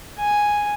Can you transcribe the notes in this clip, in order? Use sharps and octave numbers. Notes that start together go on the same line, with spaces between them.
G#5